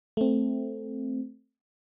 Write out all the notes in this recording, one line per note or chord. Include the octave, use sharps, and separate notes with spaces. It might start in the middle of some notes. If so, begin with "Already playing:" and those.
A3 C4